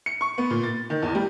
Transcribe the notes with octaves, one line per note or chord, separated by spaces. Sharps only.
C#7
C#6
B3
A#2
A6
D#3
E2
G3